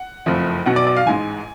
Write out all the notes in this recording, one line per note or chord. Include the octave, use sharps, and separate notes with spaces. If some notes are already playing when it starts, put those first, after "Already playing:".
Already playing: F#5
F#1 F2 F3 A3
B1 B2 F#3 F#5
D5
D5
F5
A1 G#2 G#3 G#5